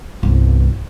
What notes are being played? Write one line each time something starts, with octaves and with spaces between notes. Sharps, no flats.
G1 C2